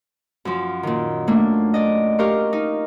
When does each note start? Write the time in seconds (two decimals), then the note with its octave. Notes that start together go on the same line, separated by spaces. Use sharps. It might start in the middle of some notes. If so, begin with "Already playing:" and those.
0.45 F#2 F3
0.83 A#2 D#3
1.27 A3 A#3 D4
1.74 D5 D#5
2.19 G4 A#4 F5 C#6
2.53 D#4